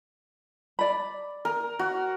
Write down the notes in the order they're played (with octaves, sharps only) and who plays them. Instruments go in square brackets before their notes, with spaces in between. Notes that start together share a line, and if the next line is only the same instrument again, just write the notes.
[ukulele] D5 B5
[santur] A#4
F#4